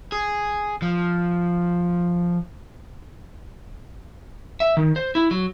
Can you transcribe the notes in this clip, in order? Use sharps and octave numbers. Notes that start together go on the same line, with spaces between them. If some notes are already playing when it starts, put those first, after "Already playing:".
G#4
F3
E5
D#3
C5
E4
F#3